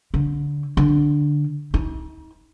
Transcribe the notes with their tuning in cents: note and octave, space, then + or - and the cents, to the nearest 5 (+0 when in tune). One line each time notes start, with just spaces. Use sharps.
D3 -20
D3 +0
D#4 +45